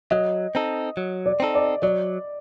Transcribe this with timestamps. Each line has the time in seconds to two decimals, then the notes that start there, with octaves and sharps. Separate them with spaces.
0.11 F#3 D#5
0.55 C4 D#4 A4
0.97 F#3
1.26 D5
1.40 C4 D#4 A4
1.55 D5
1.82 F#3 D5